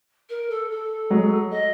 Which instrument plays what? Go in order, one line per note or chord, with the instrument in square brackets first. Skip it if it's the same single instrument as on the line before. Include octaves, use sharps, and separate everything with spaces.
[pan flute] A#4
A4
A4
[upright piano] F#3 G#3
[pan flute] D#5